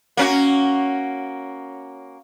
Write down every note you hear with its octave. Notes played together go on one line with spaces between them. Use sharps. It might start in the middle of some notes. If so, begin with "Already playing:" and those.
A#3 C#4 F#4